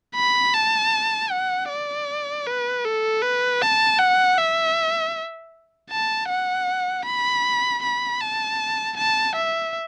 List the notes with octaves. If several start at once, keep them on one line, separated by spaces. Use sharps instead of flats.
B5
A5
F#5
D5
B4
A4
B4
A5
F#5
E5
A5
F#5
B5
B5
A5
A5
E5